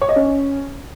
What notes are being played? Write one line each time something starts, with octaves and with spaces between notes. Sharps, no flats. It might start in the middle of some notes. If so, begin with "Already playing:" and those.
C#5
D#5
C#4